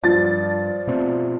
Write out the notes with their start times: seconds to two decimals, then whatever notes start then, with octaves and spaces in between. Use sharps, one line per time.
0.03 G2 F3 D5 A6
0.87 B2 A3 C4